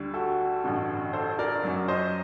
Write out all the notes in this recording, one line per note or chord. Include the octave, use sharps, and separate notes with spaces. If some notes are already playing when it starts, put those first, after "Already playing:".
Already playing: D2 D3 G3
F#4 A4
A1 G2 D3
A4 C5
A#4 D5
F#2 F#3
C5 D#5